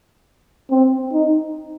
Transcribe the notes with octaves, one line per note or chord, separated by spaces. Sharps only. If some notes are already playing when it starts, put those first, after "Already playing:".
C4
D#4